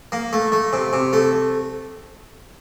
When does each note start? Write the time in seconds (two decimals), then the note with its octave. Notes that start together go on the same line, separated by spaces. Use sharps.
0.12 A#3
0.33 A3
0.52 A3
0.73 C3
0.93 C3
1.13 A3